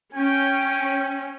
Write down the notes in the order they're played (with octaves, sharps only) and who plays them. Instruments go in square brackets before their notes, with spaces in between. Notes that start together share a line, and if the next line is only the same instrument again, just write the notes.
[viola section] C#4 [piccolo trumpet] G5